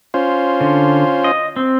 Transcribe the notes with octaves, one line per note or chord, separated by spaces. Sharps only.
C#4 F4 C5
D3
D#5
C4